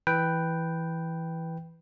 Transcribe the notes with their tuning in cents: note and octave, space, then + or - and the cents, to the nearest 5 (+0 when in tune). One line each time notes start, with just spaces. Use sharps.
E3 +0 B4 +0 G5 +0